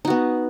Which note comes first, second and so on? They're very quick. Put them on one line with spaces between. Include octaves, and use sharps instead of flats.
D#4 F#4 B3